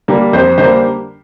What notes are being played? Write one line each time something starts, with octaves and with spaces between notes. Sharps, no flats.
D3 G3 A#3
F2 C5
D3 G3 A#3 C5